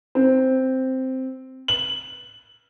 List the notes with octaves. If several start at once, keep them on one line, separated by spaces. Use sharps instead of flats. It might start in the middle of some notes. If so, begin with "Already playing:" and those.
C4
F#7